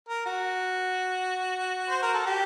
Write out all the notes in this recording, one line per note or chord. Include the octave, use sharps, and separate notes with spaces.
A#4
F#4
C5
A#4
A4
G4